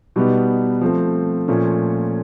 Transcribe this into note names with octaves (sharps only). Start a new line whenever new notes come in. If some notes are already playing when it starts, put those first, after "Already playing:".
B2 G3 B3 D#4 G4
F3 A3 C4
A#2 F3 A3 C#4